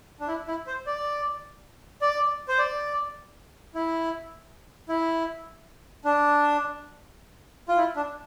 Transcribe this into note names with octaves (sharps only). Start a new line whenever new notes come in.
D4
E4
E4
C5
D5
D5
C5
D5
E4
E4
D4
F4
E4
D4